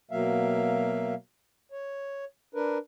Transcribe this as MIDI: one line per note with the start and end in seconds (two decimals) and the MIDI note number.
0.11 1.14 47
0.11 1.14 54
0.11 1.14 58
0.11 1.14 76
0.11 1.14 77
1.72 2.25 73
2.55 2.78 62
2.55 2.78 70
2.55 2.78 71